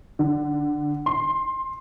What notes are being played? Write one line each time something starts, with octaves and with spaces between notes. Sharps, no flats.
D3
C6